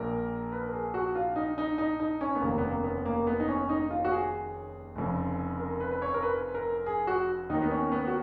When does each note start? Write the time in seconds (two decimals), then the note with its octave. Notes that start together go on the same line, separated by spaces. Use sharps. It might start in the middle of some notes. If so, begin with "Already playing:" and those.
Already playing: A#1 A#2 A#4
0.52 B4
0.66 A#4
0.73 G#4
0.94 F#4
1.15 F4
1.36 D#4
1.58 D#4
1.78 D#4
2.00 D#4
2.21 C#4
2.35 B3
2.42 F1 D#2 C#3 A#3
2.58 B3
2.63 A#3
2.84 B3
3.05 A#3
3.27 B3
3.40 D#4
3.48 C#4
3.69 D#4
3.90 F4
4.05 F#4
4.12 G#4
4.95 F1 F2 C#3
5.60 A#4
5.80 B4
5.91 B4
6.02 C#5
6.14 A#4
6.22 B4
6.54 A#4
6.86 G#4
7.07 F#4
7.49 D#2 D#3 D#4
7.62 B3
7.71 C#4
7.92 B3
8.07 F#4